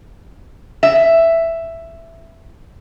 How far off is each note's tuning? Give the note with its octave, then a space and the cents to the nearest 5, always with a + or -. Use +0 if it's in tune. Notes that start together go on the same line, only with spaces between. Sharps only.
E5 +5